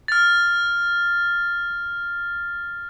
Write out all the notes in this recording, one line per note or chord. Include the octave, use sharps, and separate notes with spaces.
F6 A6